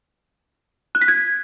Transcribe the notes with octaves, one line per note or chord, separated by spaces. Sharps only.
F#6
B6
G#6